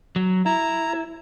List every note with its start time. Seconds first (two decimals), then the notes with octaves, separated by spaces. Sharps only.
0.16 F#3
0.46 E4 A#5